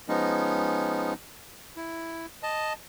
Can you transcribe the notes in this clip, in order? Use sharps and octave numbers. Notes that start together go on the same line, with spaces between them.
F3 G#3 B3 C#4 D#4
E4
D#5 A5